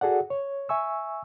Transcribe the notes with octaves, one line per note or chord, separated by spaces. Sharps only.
F#4 G#4 A4 D5 F#5
C#5
E5 G#5 C#6 E6